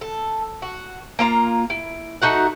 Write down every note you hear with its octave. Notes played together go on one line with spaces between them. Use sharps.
A4
F#4
A#3 F4 A#5
E4
A3 D#4 F#4 F#5